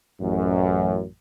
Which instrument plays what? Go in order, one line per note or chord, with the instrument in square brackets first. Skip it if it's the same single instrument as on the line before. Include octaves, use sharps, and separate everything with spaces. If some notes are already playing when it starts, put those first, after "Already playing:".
[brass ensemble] A1 F#2